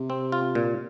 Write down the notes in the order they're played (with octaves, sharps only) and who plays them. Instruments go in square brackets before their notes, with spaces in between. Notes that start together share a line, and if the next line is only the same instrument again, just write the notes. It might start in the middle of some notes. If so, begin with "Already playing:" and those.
Already playing: [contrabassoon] C3
[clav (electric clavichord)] C4
F4
A#2